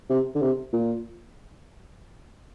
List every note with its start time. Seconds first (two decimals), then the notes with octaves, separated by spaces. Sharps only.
0.10 C3
0.35 D3
0.42 C3
0.73 A#2